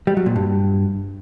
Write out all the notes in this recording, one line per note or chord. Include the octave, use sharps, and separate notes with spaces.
G3
F#3
A#2
G2